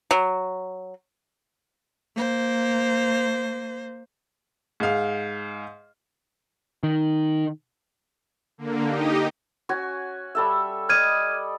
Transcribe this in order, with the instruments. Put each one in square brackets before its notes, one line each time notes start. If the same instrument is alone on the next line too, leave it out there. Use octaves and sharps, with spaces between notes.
[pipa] F#3
[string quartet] A#3 C5
[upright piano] G#2 F5
[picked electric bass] D#3
[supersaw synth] D3 A#3
D#4 G4 D#5
[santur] C#4 F#4 G#5
G3 A4 E5
[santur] D5 D#5 [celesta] F6 G#6 D#7